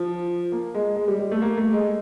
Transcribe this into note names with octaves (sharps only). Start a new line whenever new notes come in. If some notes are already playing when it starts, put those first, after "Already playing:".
Already playing: F3
A#3
G#3
G#3
G3
G3
A3
A#3
A3
G#3